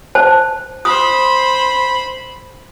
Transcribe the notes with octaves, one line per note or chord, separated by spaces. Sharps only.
C5 A5
C5 B5 D#6